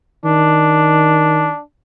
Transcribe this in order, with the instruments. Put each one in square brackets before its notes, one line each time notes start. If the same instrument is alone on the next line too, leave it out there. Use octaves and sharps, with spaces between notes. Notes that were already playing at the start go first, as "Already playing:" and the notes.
[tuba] D#3 [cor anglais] D4